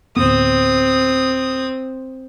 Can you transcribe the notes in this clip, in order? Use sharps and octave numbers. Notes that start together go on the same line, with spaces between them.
D1 F2 B3 C4 D#6